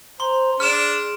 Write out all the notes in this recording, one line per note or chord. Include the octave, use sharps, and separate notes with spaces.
C5 A#5 C6 G7
D4 G#4 F6 E7